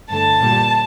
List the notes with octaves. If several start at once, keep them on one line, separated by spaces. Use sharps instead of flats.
G2 D3 A3 A5
A#2 G3 A#3